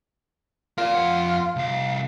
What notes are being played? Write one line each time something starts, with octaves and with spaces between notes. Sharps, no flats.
F4 A#4 D5
F2 F#5
C2 F5